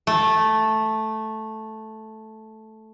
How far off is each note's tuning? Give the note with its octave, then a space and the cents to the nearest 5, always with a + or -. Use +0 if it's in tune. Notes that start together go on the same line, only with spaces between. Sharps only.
A3 -5